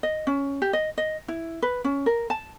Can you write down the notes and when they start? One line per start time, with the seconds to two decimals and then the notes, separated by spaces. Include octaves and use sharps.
0.03 D#5
0.27 C#4
0.62 G4
0.73 D#5
0.98 D#5
1.28 E4
1.62 B4
1.84 C#4
2.06 A#4
2.30 A5